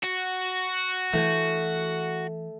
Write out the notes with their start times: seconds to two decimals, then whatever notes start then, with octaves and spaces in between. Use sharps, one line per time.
0.03 F#4
1.13 E3 A3 G#5